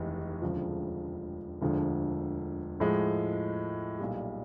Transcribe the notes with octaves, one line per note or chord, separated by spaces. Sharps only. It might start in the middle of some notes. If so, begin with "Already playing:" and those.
Already playing: F1 D#2 E3 G#3
E1 D2 C#3 F3
E1 D2 D3 F3
A2 F3 G#3
B1 A#2 G3